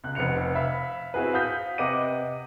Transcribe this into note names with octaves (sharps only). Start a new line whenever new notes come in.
C#2 F#6
F1 B4 C5 C#7 F7
E5 F5 B5
C4 E4 F#4 G#4 B4
F5 F#5 D#6 G6 B6
C3 B4 D#5 F#5 D6 D#7